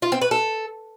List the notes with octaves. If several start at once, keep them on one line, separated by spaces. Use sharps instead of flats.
F4
C4
B4
A4